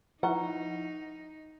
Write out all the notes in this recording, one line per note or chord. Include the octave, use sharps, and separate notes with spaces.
F3 D#4 E4 B4 F#5 A#5 C#6